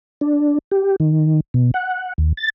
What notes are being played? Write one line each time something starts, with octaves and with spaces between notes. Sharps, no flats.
D4
G4
D#3
B2
F#5
D#2
A6